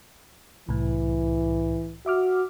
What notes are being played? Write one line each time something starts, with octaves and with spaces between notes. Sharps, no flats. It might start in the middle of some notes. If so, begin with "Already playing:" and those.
C2 A2 E3
F#4 E5 D6 F6